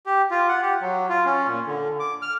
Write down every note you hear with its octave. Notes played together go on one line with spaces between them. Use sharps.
G4
F4
F#5
G4
F#3
F4
C#4
A#2
D3
D6
F6